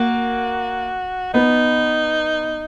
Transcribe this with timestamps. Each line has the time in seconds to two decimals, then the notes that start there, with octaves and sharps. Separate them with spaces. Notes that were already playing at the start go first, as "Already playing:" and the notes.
Already playing: A#3 F#4
1.34 B3 D#4